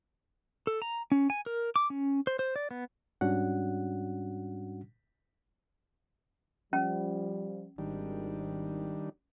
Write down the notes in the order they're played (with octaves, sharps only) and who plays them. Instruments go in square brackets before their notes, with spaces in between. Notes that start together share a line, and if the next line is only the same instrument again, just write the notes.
[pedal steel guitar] A4
A#5
C#4
G#5
A#4
D6
C#4
C5
C5
D5
B3
[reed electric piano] G#2 G3 C#4 D4 F#4 F#5
[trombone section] F3 G3 [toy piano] C#4
[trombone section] G#1 [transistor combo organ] D#3 G3 D4